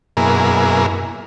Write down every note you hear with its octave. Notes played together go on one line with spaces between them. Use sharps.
F#2 B2 A#3 E4 G#4 A#4